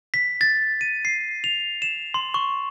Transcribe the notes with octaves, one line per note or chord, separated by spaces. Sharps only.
B6
A6
D#7
C7
F7
E7
C6
C#6